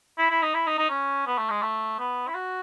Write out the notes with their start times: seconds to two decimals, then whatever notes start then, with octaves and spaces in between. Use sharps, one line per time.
0.18 E4
0.30 E4
0.42 D#4
0.54 E4
0.67 D#4
0.78 D#4
0.90 C#4
1.27 B3
1.38 A3
1.50 G#3
1.63 A3
1.99 B3
2.28 E4
2.35 F#4